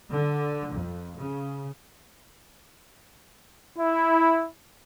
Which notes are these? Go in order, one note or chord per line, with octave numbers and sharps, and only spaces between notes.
D3
F2
C#3
E4